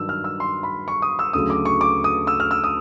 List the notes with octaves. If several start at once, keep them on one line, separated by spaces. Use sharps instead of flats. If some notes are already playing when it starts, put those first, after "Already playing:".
Already playing: G2 D#3 F#3 E6
F6
E6
C6
B5
C#6
D#6
E6
D2 C#3 F#3 D#6
D6
C#6
D6
D#6
E6
F6
E6
D#6